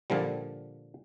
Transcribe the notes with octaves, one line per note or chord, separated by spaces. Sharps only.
A#2 D3 F3 G3